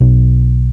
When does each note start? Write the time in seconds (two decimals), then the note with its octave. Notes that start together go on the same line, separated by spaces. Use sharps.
0.01 B1